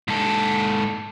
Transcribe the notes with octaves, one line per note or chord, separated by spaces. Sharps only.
G#2 A4